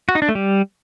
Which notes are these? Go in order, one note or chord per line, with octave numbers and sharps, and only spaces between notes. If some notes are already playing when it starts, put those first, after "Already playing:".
F#4
D#4
D4
A3
G3